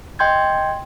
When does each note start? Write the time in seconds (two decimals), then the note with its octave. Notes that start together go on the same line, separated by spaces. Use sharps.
0.19 D#5 G5 C6 G6 G#6